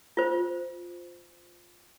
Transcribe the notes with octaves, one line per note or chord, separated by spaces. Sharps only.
F4 C5